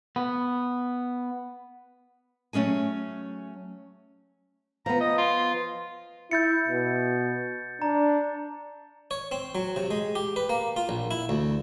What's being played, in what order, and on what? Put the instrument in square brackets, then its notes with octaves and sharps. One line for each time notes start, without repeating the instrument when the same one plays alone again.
[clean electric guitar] B3
[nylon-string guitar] F#3 A3 C#4 G#4 G#5
[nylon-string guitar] F3 B3 [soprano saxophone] A#5
[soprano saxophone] D#5
F4
[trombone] E4 [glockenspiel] G6 A6 C#7
[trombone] B2
[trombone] D4 [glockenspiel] A#5
[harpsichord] C#5
C4
F#3
C3
G#3
G4
B4
A#3
F4
A#1
E4
D2